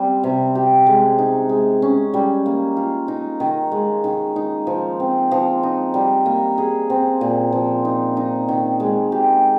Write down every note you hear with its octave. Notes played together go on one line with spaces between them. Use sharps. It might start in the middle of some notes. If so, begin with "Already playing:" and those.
Already playing: G3 C4
C3
G4
G#3
D#4
G#3
C#4
G3
A#3
F4
D#4
D#3
G#3
D#3
D#4
F3
C4
F3
D#4
G3
A#3
G#4
C4
A#2
F3
D#4
D#4
D#3
G#3
G4